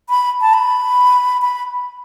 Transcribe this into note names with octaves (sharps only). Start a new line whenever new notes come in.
B5
A5
B5
B5